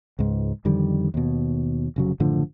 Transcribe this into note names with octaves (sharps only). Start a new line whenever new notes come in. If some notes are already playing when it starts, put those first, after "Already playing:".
C#2 G#2
F2 D3 D#3 G3
D#2 B2
F1 C#3 F#3
F#1 A2 D3 F3